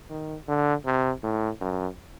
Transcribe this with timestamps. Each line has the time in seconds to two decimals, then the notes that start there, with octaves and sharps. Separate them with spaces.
0.10 D#3
0.48 D3
0.85 C3
1.23 A2
1.61 F#2